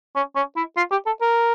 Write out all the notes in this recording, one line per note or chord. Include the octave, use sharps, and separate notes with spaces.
C#4
C#4
E4
F4
G4
A4
A#4